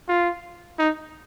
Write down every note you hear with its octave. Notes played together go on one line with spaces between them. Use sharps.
F4
D#4